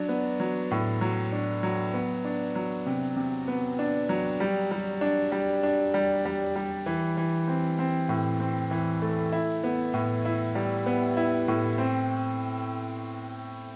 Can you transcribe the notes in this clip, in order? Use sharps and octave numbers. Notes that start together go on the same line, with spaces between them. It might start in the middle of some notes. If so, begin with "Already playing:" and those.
Already playing: F#3 D4
B3
F#3
A2
F#3
D4
F#3
B3
D4
F#3
C3
C3
B3
D4
F#3
G3
G3
D4
G3
D4
G3
G3
G3
E3
E3
C4
C4
A2
C4
E3
A3
E4
B3
A2
E4
G3
B3
E4
A2
C4